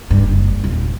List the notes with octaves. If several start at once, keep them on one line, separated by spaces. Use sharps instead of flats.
G2
F#1
D#1